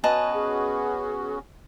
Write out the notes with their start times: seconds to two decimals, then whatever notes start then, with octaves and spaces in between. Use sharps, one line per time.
0.04 B3 C#4 F#4 B4 D#5 G#5 A5
0.34 G#4